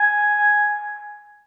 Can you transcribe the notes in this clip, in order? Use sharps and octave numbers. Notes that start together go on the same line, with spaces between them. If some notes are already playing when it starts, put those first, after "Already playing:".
Already playing: G#5